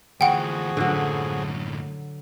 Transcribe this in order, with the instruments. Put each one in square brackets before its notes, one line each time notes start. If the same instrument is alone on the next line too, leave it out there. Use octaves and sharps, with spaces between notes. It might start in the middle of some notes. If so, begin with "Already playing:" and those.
[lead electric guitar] D2 E3 [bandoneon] F3 F#4 G#4 [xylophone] F#5 G5
[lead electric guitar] F#2 A2 [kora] D3 F#3